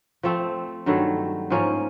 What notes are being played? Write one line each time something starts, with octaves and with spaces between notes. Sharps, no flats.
F3 A3 C4
G2 D#3 F#3 A3
G#2 F3 A#3 C#4